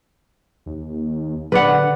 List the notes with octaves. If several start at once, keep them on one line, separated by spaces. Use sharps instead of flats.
D#2
D3 B4 D5 F#5